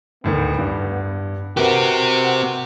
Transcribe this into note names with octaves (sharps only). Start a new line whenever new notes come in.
D2 A2 D#3 B3
G2
C4 F#4 G4 A#4 B4 F#5